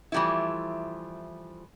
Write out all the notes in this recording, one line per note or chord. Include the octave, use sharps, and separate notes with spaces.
E3 F3 G3 A3 E4